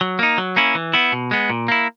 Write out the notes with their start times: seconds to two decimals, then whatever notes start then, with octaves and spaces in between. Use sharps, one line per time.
0.01 F#3
0.19 A#3 D#4
0.38 F#3
0.56 A#3 C#4 E4
0.75 E3
0.94 B3 E4
1.13 B2
1.31 G#3 B3
1.50 A#2
1.68 A#3 E4